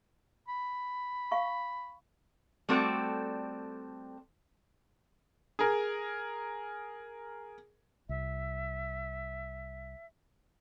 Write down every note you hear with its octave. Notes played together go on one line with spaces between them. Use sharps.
B5
F5 C#6
G3 A3 C4 F#4 A4 D5
G#4 A#4
C2 E5